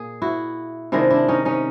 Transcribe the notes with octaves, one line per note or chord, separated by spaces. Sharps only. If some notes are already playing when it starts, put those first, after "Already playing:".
Already playing: A#2 A#3 G#4
E4 F#4
C3 D#3 G#3 D4 E4
D4 E4
C#4 D#4
C#4 D#4